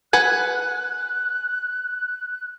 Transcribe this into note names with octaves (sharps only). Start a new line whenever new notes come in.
B4 F#5 G#5 F#6